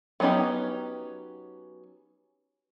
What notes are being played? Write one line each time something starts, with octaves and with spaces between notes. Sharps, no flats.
F#3 B3 C#4 D#4 G4